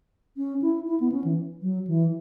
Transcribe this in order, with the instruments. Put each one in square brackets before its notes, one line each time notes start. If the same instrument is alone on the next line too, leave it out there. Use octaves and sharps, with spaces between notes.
[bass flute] C#4
E4
E4
B3
C#4
E3
F#3
E3